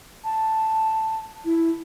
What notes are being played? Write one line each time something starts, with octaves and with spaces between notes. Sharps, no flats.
A5
E4